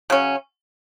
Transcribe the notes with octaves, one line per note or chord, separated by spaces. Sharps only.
C#3 F#3 C#4